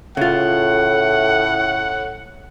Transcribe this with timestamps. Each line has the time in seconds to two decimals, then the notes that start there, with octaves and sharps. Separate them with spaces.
0.17 A2 C#3 F4 F#5